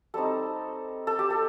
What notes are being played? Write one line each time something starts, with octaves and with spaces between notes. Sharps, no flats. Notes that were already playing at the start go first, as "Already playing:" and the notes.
G3 C4 D#4 A4
A4
G4
A4